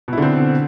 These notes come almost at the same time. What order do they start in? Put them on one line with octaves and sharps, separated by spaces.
B2 E4 D3 C4